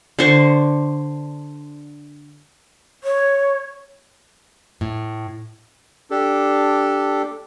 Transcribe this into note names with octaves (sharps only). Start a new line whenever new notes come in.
D3 D4 C5 C#6
C#5
A2
D4 G4 A4